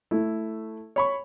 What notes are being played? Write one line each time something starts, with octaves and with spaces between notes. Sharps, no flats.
A3 E4
C#5 B5 C#6